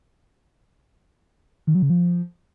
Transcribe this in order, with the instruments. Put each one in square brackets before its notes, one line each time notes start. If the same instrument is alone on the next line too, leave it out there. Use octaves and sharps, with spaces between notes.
[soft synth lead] D#3
F#3
C#3
F3